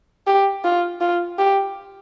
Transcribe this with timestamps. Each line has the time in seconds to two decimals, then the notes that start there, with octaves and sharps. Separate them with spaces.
0.27 G4
0.64 F4
1.01 F4
1.38 G4